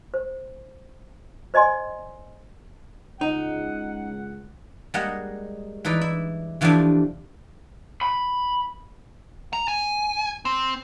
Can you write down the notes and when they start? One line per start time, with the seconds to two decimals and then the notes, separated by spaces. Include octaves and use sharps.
0.14 C5
1.54 C5 D5 D#5 G#5 C6
3.21 C#2 D#4 F#5
4.94 G3 G#3 A#3 D#5 F#5
5.85 E3 D#4 B4 D5
6.01 E4
6.61 C3 E3 F3 G3 A3 D4
8.01 B5
9.53 A#5
9.68 G#5
10.45 C4